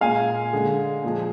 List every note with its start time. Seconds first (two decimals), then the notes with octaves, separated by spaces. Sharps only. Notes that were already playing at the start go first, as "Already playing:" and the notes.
0.01 A#2 G#3 F5 G#5
0.53 D3 G#3
1.03 A#2 F3 G#3